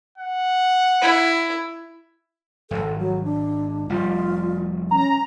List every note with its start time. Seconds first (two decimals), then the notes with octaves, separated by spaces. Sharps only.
0.18 F#5
1.02 E4
2.71 D1 G#1 A4
2.99 F#3
3.24 D4
3.89 F1 G3 F4
4.91 C#4 A#5